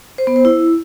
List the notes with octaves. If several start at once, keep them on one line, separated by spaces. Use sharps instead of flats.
C5
B3
C5
E4